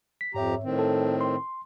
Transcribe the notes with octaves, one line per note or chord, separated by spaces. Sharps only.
B6
F2 G#2 G4 C#5 E5 A#5
A2 D#3 C4
A4 A5
C6